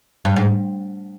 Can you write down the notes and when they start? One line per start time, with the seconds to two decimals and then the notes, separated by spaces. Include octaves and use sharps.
0.25 G2
0.36 G#2